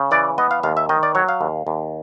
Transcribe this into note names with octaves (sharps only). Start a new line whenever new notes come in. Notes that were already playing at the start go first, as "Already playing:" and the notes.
Already playing: C#3
E3 D5
B3 D#5
F5
D#2 F5
E5
D#3 D#5
D5
F#3 C#5
F5
D#2
D#2